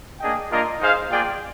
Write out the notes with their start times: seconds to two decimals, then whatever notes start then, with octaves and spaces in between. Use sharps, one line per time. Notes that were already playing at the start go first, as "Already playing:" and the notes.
0.19 A#3 D4 G#4 D#5 G5
0.49 A#3 D4 F4 A#4 D#5
0.79 D#4 G#4 C5 F5
1.09 A#3 F4 G#4 D5 G5